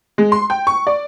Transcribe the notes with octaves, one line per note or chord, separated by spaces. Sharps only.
G#3
C6
G5
C#6
D5